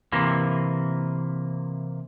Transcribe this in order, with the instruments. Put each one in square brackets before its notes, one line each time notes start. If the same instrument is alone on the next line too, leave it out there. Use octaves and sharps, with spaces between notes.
[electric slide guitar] C3 E3 A#3